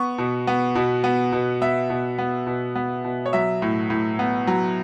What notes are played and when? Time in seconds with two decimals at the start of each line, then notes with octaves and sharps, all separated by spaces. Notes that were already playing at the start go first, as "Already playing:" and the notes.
Already playing: B3 C#6
0.18 B2
0.47 B3
0.75 B2
1.04 B3
1.32 B2
1.62 B3 E5
1.90 B2
2.18 B3
2.47 B2
2.75 B3
3.04 B2
3.26 C#5
3.33 F#3 E5
3.62 A2
3.90 A2
4.19 B3
4.47 F#3